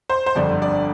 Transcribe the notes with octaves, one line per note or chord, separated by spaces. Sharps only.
C5
C5
G1 F2 D3 G3 D4 D5
D5